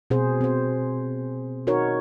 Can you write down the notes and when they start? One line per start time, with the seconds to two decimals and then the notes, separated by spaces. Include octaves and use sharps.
0.10 B2 C4 G#4 C5
0.41 C4 C5
1.67 D#4 F#4 A#4 C#5